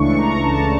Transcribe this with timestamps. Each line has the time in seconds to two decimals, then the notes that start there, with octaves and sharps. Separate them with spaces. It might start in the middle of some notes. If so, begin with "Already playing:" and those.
Already playing: C#2 C#3 E3 A3 D4 C#6
0.18 A#5
0.43 A5